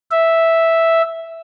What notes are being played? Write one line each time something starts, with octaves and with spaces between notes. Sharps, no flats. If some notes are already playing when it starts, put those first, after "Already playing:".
E5